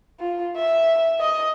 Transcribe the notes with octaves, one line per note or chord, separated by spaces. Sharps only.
F4
E5
D#5